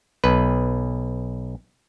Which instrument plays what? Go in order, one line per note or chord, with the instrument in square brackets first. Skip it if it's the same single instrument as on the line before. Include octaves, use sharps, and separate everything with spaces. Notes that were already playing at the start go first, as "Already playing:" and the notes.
[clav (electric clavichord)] B1 B4